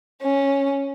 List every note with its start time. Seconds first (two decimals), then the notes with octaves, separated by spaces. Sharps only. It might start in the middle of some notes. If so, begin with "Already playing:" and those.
0.22 C#4